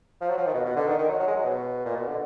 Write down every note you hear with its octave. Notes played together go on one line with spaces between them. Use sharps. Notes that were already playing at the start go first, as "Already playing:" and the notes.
F3
F#3
F3
D#3
B2
B2
D3
D#3
D#3
F#3
F#3
G#3
F#3
B2
A#2
B2
D3